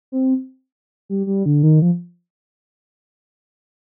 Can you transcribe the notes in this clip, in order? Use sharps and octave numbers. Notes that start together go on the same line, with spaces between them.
C4
G3
G3
D3
D#3
F3